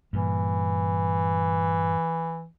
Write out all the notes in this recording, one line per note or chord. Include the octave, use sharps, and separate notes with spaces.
G2 A#2 E3